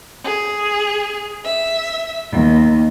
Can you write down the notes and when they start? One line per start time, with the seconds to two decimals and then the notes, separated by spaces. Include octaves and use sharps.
0.24 G#4
1.43 E5
2.31 D#2